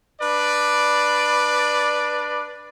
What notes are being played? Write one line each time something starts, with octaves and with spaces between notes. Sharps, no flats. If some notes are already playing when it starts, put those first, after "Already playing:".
D4 B4 D5